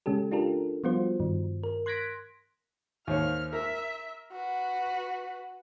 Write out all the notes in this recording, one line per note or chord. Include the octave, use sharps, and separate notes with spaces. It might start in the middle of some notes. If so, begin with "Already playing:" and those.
C#3 G#3 C#4 G4 A4
D4 F4 G4 A4 A#4
F3 G3 B3 F4 F#4 C5
G2 D#3
A#4
C6 F#6 G#6 A#6 B6 D7
D#2 C5 C#5 F6
A#4 E5
F#4 B4